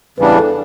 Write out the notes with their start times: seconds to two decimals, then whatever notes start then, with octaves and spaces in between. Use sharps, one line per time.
0.18 E2 C#3 E3 G3 D4 B4
0.38 A4